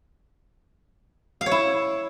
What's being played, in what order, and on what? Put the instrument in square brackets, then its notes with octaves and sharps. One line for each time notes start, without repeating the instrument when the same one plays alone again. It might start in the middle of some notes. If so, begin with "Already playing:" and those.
[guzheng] F5
C#5
E4